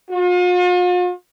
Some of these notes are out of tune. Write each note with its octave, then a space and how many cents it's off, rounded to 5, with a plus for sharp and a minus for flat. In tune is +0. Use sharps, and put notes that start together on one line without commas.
F4 +45